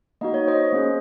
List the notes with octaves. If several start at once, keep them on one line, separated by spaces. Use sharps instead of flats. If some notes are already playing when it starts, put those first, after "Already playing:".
A#3 D#4 F#4 D#5
C#5
C5 D#5
A#3 C#4 G#4